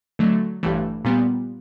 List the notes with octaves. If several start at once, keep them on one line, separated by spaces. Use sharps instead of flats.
D3 F#3 A3
A1 G2 E3 A3
A#2 G3 B3